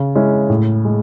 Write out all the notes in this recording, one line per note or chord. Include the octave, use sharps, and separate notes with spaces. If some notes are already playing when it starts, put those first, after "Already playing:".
Already playing: C#3
G#3 C#4 E4
A2
G#3